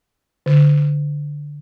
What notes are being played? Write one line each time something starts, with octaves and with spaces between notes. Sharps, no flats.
D3